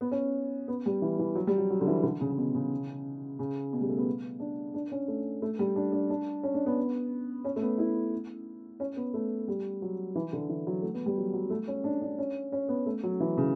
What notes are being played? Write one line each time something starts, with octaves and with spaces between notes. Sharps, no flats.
B3
C#4
B3
G3
E3
E3
F#3
G3
F#3
F#3
D3
E3
D3
C#3
C#3
B2
C#3
C#3
B2
G3
A3
B3
D4
D4
C#4
A3
A3
G3
D4
D4
D4
C#4
D4
B3
C#4
A3
B3
E4
C#4
B3
A3
G3
F#3
E3
D3
E3
F#3
A3
B3
G3
F#3
F#3
A3
C#4
D4
D4
C#4
C#4
B3
A3
F#3
E3
C#3